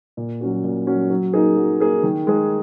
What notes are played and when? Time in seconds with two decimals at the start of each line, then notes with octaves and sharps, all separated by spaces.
0.17 A#2
0.41 F#3 C#4 F#4
0.64 A#2
0.87 F#3 C#4 F#4
1.10 F#3
1.34 A#3 D#4 G#4
1.57 F#3
1.80 A#3 D#4 G#4
2.03 D#3
2.27 G#3 D#4 G#4